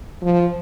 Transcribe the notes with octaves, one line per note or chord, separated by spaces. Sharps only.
F3